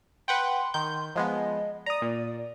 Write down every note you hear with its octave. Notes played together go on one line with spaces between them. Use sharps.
B4 F#5 G5 C6
D#3 G6
F3 G#3 B3 D#5
D5 A#5 D#6
A#2